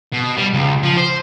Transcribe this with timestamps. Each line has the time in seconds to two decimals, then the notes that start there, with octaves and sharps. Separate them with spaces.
0.13 B2
0.37 G3
0.54 C#2
0.83 F3
0.98 C5